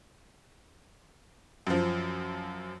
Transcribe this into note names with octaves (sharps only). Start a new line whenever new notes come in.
F#2 F3